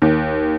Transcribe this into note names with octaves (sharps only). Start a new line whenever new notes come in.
D#2